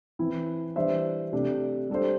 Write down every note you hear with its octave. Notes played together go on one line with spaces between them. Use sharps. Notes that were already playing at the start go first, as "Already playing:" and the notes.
E3 C4 E4
E3 G3 D4 C5 E5
C3 A3 D4
G3 D4 A4 C5